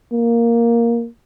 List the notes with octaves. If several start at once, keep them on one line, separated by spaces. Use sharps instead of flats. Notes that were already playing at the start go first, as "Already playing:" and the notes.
A#3